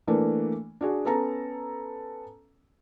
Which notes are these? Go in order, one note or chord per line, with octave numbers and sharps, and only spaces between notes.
E3 A3 A#3 D4
D4 F#4 G#4
B3 C#4 A4 A5 A#5